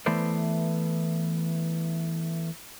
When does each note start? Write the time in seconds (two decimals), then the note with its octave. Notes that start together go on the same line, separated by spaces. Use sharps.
0.06 E3 A3 B3 C5 D5